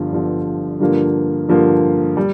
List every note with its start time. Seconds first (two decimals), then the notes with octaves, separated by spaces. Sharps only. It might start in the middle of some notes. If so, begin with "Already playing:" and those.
Already playing: G1 G2 D3 F3
0.13 G1 G2 D3 F3
0.80 G2 D3 F3 A#3
1.48 G2 D3 F3 A#3
2.17 G3